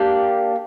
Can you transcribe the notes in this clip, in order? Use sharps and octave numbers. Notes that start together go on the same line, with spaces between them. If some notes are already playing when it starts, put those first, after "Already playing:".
Already playing: A#3 D4 G4